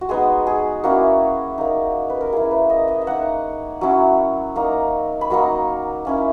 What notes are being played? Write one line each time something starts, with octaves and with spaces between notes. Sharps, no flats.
F#4
G#3 B3 D#4 G#4
G#4
A#3 C#4 E4 F#4
A#3 D#4
B4
A#4
A#3 E4 G#4
B4
D#5
D#5
E5
A#3 D#4 F#5
F#3 C#4 E4
A#3 D#4
B5
F#3 A#3 D#4 C#6
A#3 C#4 E4